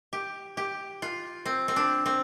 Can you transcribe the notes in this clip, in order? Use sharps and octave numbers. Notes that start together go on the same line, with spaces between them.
G4
G4
F4
C4
C4
D4
C4